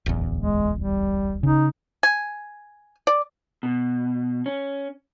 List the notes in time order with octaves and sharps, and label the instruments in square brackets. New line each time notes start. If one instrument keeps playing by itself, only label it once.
[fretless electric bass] D1 A1 E2
[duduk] G#3
G3
[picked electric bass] C#3 [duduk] D#4
[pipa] G#5
D5
[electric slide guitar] B2
C#4